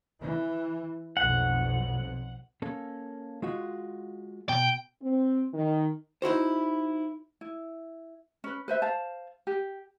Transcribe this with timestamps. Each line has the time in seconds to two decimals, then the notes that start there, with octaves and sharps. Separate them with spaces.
0.20 E3
1.17 B1 F2 F#5
2.62 A#3 C#4 A4
3.42 G#3 F4 F#4
4.49 B2 G5
5.01 C4
5.54 D#3
6.22 D#4 E4 F#4 C5
7.41 E4
8.44 C#4 B4
8.68 B4 C5 E5
8.82 C5 F5 A5
9.47 G4